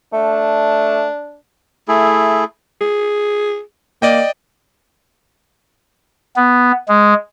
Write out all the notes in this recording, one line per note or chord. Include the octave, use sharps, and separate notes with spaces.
A3 D4
A3 E4 G#4
G#4
A#3 D5 D#5 G5
B3
G#3